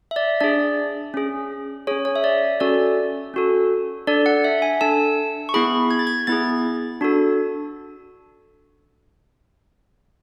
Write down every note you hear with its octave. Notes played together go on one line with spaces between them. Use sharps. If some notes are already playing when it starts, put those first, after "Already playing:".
E5
D5
D4 G#4 D5
C#4 G#4
C#4 G#4 C#5
C#5
E5
D5
C#4 F#4 A4 D5
C#4 F#4 A4
D4 A4 D5
F#5
E5
G#5
D4 A4 A5
C#6
B3 E4 G#4 B5
G#6
A6
G#6
B3 E4 G#4 A6
D4 F#4 A4